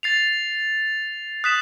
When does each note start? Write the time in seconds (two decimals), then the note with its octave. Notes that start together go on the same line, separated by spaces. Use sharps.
0.03 A6 C7 F7
1.44 D#6 F#6 B6 E7